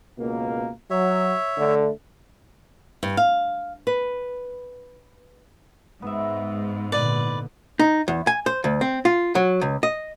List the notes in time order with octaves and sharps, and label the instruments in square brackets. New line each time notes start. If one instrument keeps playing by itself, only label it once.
[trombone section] C#2 B2 A#3
[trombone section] F#3 [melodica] C#5 E5
[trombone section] D3 A3
[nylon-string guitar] G2
F5
B4
[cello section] G#2 [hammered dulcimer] B3 E5
[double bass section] A#2 D3 [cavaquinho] B4 D5
[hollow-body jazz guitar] D#4
E2
G#5
C5
D2
C4
F4
F#3
C#2
D#5